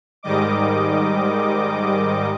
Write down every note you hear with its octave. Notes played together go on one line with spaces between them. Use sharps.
G#2 D#3 G3 D#5 D6